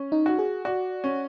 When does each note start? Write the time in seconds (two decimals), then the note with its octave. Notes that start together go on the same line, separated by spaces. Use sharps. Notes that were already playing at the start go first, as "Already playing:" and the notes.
Already playing: C#4
0.12 D#4
0.26 F#4
0.39 G#4
0.65 F#4 D5
1.04 C#4